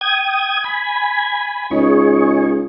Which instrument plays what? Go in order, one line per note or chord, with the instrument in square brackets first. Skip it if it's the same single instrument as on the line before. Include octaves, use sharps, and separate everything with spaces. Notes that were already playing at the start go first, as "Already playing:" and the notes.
[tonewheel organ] G5 D#6 G#6
G#5 B5
[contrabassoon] C#2 [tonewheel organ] D#4 G#4 C#5